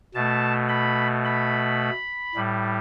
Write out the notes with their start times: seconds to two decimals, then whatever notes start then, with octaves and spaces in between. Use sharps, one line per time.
0.15 B2 A3 A5
0.69 B5
1.25 B5
2.35 A2 G3